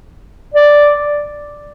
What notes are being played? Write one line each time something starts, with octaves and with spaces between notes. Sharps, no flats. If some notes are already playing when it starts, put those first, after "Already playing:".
D5